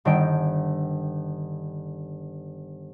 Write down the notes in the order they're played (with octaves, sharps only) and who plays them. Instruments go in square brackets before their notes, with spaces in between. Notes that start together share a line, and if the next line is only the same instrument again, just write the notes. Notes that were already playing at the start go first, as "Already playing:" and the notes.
[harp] G1 D#3 D4 G5 D7